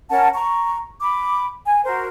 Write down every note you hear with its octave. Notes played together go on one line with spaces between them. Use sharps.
C#4 A#4 F#5 A5
A#5 C#6
B5 D6
G#5
F#4 A#4 C5